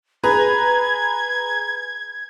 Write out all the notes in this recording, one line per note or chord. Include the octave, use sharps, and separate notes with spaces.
G#4 B4 A#5 G#6